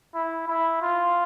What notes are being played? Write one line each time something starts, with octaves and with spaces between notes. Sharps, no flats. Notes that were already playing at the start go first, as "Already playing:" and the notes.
E4
E4
F4